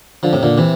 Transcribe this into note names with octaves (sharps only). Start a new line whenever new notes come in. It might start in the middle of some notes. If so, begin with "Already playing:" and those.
D3 F3
A2 C3
A#2 D3
C3 E3